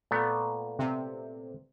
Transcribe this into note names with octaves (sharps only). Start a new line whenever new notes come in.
A#2 A3 B3
C3